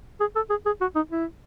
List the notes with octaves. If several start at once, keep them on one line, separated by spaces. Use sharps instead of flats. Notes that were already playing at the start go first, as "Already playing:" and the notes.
G#4
A4
G#4
G#4
F#4
D#4
E4